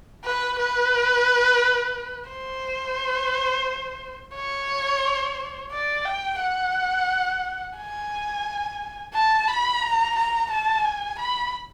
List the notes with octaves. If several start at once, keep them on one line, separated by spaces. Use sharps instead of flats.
B4
B4
C5
C#5
D5
G5
F#5
G#5
A5
B5
A#5
A#5
A5
G#5
B5